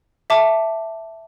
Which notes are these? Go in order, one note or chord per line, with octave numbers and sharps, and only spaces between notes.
E5 A5 D6